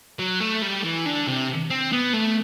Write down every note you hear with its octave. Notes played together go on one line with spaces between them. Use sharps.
F#3
A3
G3
E3
D3
C3
C4
B3
A3